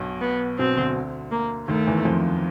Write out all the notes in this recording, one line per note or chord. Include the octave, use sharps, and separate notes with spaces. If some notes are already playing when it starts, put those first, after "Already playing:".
Already playing: B1 B2
B3
B1 B2 C4
D2 D3
A#3
D#2 D#3 A3
E2 E3
F2 F3